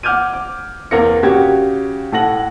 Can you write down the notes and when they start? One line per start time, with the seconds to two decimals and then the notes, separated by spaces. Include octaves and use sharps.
0.03 F#5 D6 F6 G6 G#6 D#7
0.33 D6
0.91 E2 A#3 A#4 A#6 C#7
1.23 C#3 F#4 G4 G#6
2.12 A2 A4 F#5 A#6 F#7